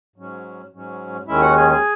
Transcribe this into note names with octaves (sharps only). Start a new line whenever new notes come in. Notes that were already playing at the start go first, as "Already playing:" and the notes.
G#2 F#3 C#4
G#2 F#3 C#4
D#2 D#3 G#3 C#4 E4 E5
F#4 F#5
G#4 G#5
G#4 G#5